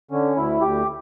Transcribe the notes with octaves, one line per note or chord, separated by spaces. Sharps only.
D3 C#4
D2 E4
D2 G4